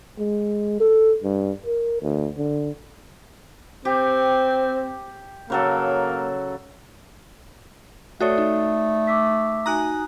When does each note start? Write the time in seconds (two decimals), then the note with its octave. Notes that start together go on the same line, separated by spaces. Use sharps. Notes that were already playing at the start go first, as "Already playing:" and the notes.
0.19 G#3
0.80 A4
1.24 G2
1.66 A#4
2.02 D2
2.37 D3
3.85 C4 G4
5.50 C#3 F#3 A#3 A4
8.20 A3 F#4 A4 C#5 D5 D#6
8.38 D#4
9.07 D6 E6 B6
9.66 D#4 F#4 G#5 A#5 D#6 F#6